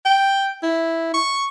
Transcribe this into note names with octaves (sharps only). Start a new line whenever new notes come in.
G5
E4
C#6